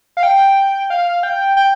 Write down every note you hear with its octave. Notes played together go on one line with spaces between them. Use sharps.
F5
G5
F5
G5
G5